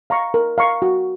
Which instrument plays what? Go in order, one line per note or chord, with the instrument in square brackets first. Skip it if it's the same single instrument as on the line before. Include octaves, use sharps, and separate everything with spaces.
[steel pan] F5 A#5 C#6
A#4
F5 A#5 C#6
F#4